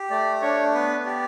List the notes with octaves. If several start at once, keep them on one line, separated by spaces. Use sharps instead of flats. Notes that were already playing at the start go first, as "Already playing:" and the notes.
Already playing: G4
A3 D5
D4 C#5
B3 B4
G4 D5